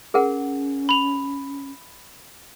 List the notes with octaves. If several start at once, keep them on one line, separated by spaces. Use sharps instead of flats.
C#4 G#4 A#4 F#5
B5 F7